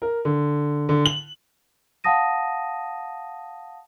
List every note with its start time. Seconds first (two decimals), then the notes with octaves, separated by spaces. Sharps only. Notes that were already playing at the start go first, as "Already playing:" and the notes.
0.02 A#4
0.25 D3
0.89 D3
1.06 F#7
2.04 F5 F#5 A5 D#6 A#6 D#7